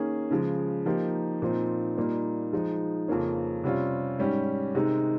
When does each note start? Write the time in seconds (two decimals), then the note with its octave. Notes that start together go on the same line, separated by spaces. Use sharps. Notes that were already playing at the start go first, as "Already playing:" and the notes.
Already playing: D#3 A#3 C#4 G#4
0.31 C#3 F3 G#3
0.86 F3 A#3 D#4 G4
1.42 A#2 F3 C4 D#4
1.97 A#2 G3 A#3 D#4
2.53 F3 G#3 D#4
3.08 F2 C#3 F3 A#3 C#4
3.64 C3 G3 C#4 F4
4.19 G#2 G3 C#4 G4
4.75 C3 D#3 G#3 D#4